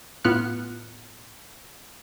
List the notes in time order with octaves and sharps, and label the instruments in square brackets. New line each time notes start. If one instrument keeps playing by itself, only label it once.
[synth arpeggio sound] A2 B3 F4 F6 F#6 C#7